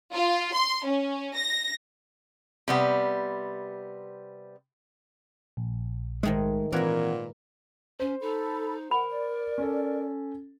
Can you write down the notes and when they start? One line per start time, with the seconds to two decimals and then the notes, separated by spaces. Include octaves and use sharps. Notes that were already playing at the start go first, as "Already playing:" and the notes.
0.13 F4
0.54 C6
0.85 C#4
1.35 A#6
2.68 C3 G3 B3
5.57 A#1
6.23 G#2 D#3 G#3 A3
6.72 A#2 E3 C4 A#4 B4 F#5 G#6
8.00 C#4 C5
8.21 D#4 A4 B5
8.91 A#4 F#5 B5
9.10 D5
9.58 C#4 A4